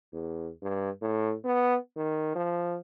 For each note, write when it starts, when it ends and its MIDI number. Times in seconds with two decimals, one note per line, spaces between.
0.13 0.51 40
0.62 0.90 43
1.01 1.35 45
1.44 1.76 59
1.97 2.32 51
2.35 2.77 53